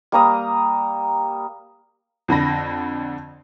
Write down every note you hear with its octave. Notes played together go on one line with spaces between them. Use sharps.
G3 A#3 A#5 D#6
F2 D3 B5 A#6